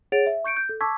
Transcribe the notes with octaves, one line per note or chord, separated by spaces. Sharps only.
G#4 C#5 F#5 A6 D7 F7
E5
C#6 G6 C#7 D7
G6
A4
A5 C#6 D6 E6 G#6 B6